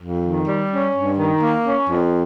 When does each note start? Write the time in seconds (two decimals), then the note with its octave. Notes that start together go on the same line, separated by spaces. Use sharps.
0.01 F2
0.24 D#3
0.47 G3
0.71 C#4
0.94 G2
1.18 D#3
1.41 A#3
1.65 C#4
1.88 F2